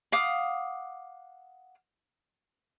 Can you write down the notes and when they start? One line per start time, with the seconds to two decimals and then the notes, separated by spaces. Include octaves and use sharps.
0.12 F5 F#5 D6 D#6